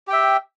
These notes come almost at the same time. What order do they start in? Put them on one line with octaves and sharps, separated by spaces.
G4 G5 E5